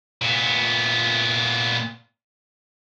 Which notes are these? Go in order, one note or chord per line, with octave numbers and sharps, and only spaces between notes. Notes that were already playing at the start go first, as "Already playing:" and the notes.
A#2 B3